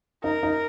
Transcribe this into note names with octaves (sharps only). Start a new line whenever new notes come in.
D#4 A#4
D#4